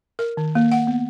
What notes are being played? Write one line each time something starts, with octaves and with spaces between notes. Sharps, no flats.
A#4
D#3
A#3
F#5
B3